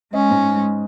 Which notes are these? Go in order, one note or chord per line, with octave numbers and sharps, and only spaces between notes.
G#3 C#4 D#5
G#2